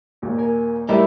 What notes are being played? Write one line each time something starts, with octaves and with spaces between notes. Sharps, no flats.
D#2 A#2
A#4 G#5
G3 A3 D#4 E4 A#4 G5 B5